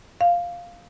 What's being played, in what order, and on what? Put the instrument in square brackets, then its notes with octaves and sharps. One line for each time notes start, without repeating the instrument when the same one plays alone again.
[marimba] F5